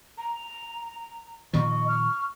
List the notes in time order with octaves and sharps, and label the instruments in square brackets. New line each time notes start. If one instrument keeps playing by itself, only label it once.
[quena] A#5
[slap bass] A#2 D#3 F3 [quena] D#5 [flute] C#6
[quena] F6